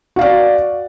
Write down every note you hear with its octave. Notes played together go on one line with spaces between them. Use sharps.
F#4 D5 F5